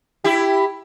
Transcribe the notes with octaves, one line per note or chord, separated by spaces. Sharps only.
E4 G4